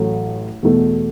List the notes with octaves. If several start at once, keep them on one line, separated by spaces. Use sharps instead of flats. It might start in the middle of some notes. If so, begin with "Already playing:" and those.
Already playing: A1 A2 F#3 A3
E2 B2 A3